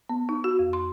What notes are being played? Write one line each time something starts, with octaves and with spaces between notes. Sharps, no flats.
B3
D#4
F#4
F2
C6